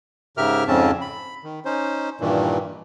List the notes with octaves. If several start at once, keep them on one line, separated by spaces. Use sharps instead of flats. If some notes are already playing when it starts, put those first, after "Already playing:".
G#2 C#3 G4 A#4 E5 F6
F2 G#2 C#3 C4 C#4 A5
B5
D#3
C#4 D#4 C5
G2 A#2 D#3 E3